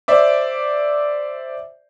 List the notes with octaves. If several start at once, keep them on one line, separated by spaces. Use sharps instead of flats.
C5 D5 E5 D6